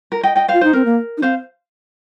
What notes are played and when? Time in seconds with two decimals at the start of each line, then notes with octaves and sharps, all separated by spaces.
0.12 A#4
0.23 D#5 G5
0.36 D#5 G5
0.48 F4 C5 F5
0.61 D#4 C5
0.73 C4 A#4
0.85 A#3
1.18 D#4
1.22 C4 C5 F5